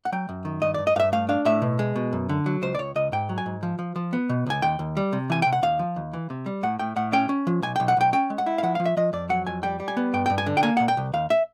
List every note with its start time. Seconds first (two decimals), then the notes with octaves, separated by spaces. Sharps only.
0.05 F#5
0.12 F#3 G5
0.29 F#2
0.45 D#3
0.62 G2 D#5
0.74 D5
0.78 G2
0.87 D#5
0.96 G2 F5
1.00 E5
1.12 A3 F5
1.29 D4 F5
1.45 A2 E5
1.62 B2
1.79 G#3
1.96 B2
2.13 F#2
2.29 D3
2.46 F#3
2.62 C#2 C5
2.75 D5
2.79 C#2 C#5
2.95 C#2 D#5
3.12 G#2 G5
3.29 F#3
3.38 G#5
3.46 G#2
3.63 F3
3.79 F3
3.96 F3
4.13 B3
4.29 B2
4.46 C#2 G#5
4.62 D#2 G5
4.79 D#2
4.97 G3
5.13 C3
5.30 E3 G#5
5.42 C3 G5
5.53 F#5
5.62 D#2 F5
5.79 F3
5.96 D#2
6.13 E3
6.30 C3
6.46 G3
6.63 A2 F#5
6.79 A2 G5
6.96 A2 F#5
7.13 C#4 G5
7.29 C#4
7.47 F3
7.62 B1 G#5
7.76 G5
7.80 B1
7.88 F#5
7.97 B1 G5
8.13 C#4 G5
8.30 G#3
8.38 F#5
8.46 E4
8.58 F5
8.63 F3 F#5
8.75 F3 F5
8.85 E5
8.97 F3 D#5
9.13 F2 D5
9.29 F#3 F#5
9.47 F2 G#5
9.63 G3 G5
9.80 G3
9.88 G#5
9.97 B3
10.13 G2 G5
10.26 G5
10.30 G2
10.38 G#5
10.46 D3
10.57 G5
10.63 A#3 G#5
10.77 A#2 F#5
10.88 G5
10.97 C2
11.13 D#2 F5
11.30 E5